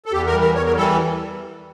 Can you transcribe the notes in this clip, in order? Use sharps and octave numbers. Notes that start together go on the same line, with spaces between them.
A4
E2 G4
A#4
E3 G3
A#4
E2 C#5
A#4
E3 G3 A4